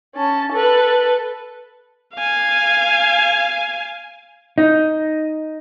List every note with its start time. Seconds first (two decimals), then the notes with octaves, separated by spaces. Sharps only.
0.15 C#4 A5
0.52 A4 B4
2.14 F5 G#5
4.58 D#4